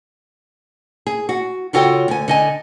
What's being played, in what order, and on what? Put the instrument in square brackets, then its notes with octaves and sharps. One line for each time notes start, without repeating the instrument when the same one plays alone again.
[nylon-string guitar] G#4
F#4
C#3 F4 F#4 A4 C#5 G5
D2 G#5
D3 D#5 G#5